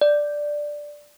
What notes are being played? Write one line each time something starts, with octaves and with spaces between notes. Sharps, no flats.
D5